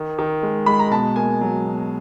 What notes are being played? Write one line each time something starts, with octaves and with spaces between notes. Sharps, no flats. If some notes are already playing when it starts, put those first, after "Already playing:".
Already playing: D#3
D#3
G#3
G#3 B5
A#5
B2 A5
A#3 G#5
F#3
B2